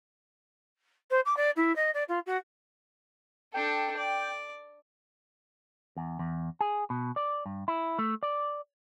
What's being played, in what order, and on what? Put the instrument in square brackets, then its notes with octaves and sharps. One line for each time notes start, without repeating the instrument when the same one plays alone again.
[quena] C5
D6
D5
E4
D#5
D5
F4
F#4
[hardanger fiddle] D4 A4 [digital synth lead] G5
[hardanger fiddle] D5
[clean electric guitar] E2
E2
G#4
B2
D5
G2
E4
A3
D5